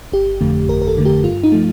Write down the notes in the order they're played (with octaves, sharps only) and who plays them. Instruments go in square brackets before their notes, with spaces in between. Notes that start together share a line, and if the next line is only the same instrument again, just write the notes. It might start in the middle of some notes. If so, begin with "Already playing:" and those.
[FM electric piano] G1 G4
F2 D3 A3
G1 A#4
A#4
A4
F2 D3 A3
G4
G2 F4
D#4
F3 A3